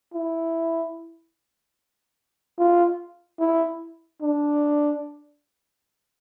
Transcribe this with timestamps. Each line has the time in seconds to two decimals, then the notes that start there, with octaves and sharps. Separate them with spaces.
0.14 E4
2.59 F4
3.40 E4
4.22 D4